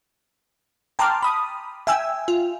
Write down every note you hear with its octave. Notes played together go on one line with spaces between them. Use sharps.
G5 A5 A#5 C6 D6 F6
B5 D#6
E5 G5 G#5 E6
F4